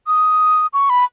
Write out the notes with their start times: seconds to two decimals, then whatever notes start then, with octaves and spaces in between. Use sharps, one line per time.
0.07 D#6
0.73 C#6
0.90 B5